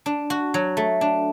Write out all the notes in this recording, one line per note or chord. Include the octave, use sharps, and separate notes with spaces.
D4
F#4
F#3
A3
D4